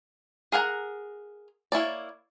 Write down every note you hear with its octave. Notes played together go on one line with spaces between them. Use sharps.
G#4 A#4 F#5 G#5 A#5
A#3 E4 C#5 D5